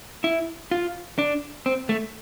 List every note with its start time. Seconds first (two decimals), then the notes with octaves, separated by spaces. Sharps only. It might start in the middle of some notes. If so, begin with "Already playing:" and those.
0.24 E4
0.71 F4
1.19 D4
1.66 C4
1.89 A3